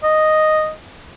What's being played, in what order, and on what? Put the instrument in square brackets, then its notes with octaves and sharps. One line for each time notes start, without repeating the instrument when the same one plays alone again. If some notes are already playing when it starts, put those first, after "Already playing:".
[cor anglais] D#5